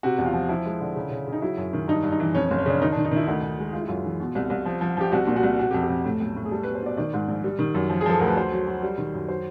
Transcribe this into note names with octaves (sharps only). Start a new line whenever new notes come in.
C3 F#4
E2
F4
F3
F3 E4
G#3
D3
C#3
C#3
C#3
D#4
F#3 E4
F#2
D#3
G2 D#4
G2
D#4
E3
F2 C#4
C#4
F#1
C#4
C#3 D4
D#3 D#4
D4
D#3
D#4
D#3 E4
D2 D#4
D2
G#3
G#3 F4
E4
F#2 F4
E3
B2
C2
C2
F3
F3
F3 G4
C2 F#4
A#2
F#4
C2
C3 F#4
G4
F2
G4
F2
A2
B1
A2
G#4
G3 A4
B4
B2
C5
B2 D5
D#3 D5
G#2
A#1
G3
D#3
F#2
F3
G#4
F3 A4
D2 A#4
B4
F#3 C5
F#3
F#3
G3
D#3
F#2
F#3 C5